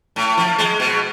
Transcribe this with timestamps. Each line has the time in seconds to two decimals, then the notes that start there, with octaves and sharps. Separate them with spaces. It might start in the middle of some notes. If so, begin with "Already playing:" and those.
0.16 A2
0.37 F3
0.58 G#3
0.80 B2